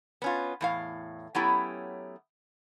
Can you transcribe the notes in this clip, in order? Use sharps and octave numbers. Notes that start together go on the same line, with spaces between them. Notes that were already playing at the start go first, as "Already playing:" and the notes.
B3 C#4 F4
E2 A2 F5
F#3 A3 B3 C#4 E4 G4